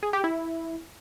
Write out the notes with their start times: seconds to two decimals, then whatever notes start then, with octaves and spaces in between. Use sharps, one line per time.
0.03 G#4
0.13 G4
0.24 E4